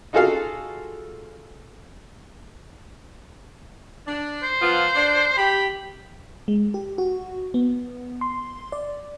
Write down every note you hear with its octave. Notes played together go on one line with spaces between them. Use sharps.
D#4 F4 F#4 G#4 A4 F5
D4
C5
F3 B3 F4
D4
G4 B5
G#3
G4
F#4
B3
C6
D5